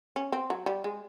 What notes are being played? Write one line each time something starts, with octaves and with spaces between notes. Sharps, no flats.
C#4
C4
F#3
G3
G#3